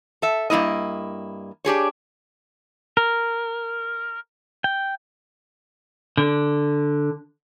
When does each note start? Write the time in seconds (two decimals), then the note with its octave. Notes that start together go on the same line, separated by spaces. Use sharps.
0.22 A4 E5
0.50 G2 C#3 A#3 E4 D#5
1.65 D4 G4 G#4 C#5
2.97 A#4
4.64 G5
6.17 D3